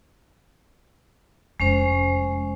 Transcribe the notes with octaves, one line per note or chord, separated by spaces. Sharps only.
F1 G#3 C#4 C5